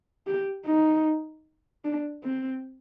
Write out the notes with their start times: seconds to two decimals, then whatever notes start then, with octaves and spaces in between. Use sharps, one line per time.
0.27 G4
0.66 D#4
1.85 D4
2.24 C4